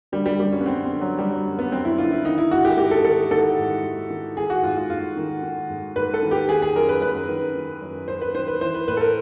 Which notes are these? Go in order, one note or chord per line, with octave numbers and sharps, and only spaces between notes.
D3 G3
G3
F#2 G3
C#4
B3
F#2 C4
C4
D3
F#3
D3 G3
F#3
F#2
B3
F#2 C4
E4
D3 F4
E4
D#3 D#4
E4
G#2 F#4
G4
G#2 G4
A4
D#3 A4
D#3 A4
G#2
G#2
D#3
D#3 G#4
F#4
G#2 F4
F4
G#2 F4
D#3
D#3
G#2
G#2 B4
A4
D#3
G4
D#3 G#4
G#4
F#2 A#4
B4
F#2 B4
D#3
D#3
F#2
F#2 C5
B4
D#3 C5
B4
E3 C5
B4
A2 B4
A4
A#4